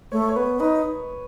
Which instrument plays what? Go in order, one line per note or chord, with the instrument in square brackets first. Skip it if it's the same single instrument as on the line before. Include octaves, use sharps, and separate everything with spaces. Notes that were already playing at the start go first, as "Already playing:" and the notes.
[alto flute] A3 [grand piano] C#5
[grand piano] C#5
[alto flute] B3 [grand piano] B4
[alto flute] D#4 [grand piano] B4